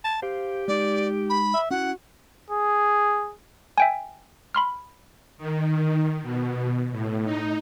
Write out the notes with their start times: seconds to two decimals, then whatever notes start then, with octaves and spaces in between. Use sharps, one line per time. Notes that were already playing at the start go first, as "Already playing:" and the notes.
0.05 A5
0.22 G4 C5 F5
0.68 G#3 D#4 D5
1.30 B5
1.54 E5
1.71 C#4 E4 F#4 F#5
2.50 G#4
3.78 E5 G5 G#5
4.55 B5 C6 F6
5.38 D#3
6.23 B2
6.92 A2
7.24 D#4